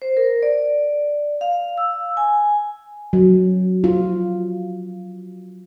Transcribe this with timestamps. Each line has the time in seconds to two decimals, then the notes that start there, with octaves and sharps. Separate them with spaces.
0.02 C5
0.17 A#4
0.43 D5
1.41 F5
1.78 E6
2.17 G#5
3.13 F#3
3.84 F4